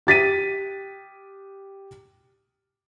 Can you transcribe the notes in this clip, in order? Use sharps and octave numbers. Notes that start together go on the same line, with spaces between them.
G4 A6 B6 D#7